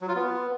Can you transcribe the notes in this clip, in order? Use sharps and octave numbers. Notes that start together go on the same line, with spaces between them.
F#3
F4
B3